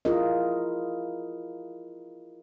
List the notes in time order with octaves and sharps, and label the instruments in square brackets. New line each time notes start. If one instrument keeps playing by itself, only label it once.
[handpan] E4 F4 G#4 A#4 D#5